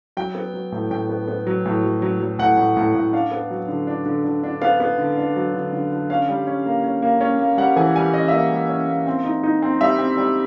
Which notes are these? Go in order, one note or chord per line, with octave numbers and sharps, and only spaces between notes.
F#3 G5
B3
F#3
A2
A2 G5
B3
B3
F#3
A2
F#3
F#3
F#3
A2 F#5
A2
A2
A2
D4 F5
B3
F#3
D3
D4
D3
D3
D4
B3 F5
B3
D3
D4
F#3
D3
D3
D3
C#4 F5
G3
C#4
A#3
C#4
A#3
C#4
A#3
G3 F#5
E3 G#5
G3 G#5
C#4 D#5
E5
A#3 D#5
G3
C#4
A#3
C4
D#4
D#4
C4
G3 E5
C4
G3